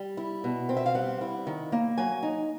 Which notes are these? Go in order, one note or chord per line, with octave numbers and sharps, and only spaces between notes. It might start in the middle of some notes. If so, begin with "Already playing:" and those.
Already playing: G3
E4
B2
C4
E5
F5
G3 F#5
E4
D#3
A#3
F#3 G#5
D#4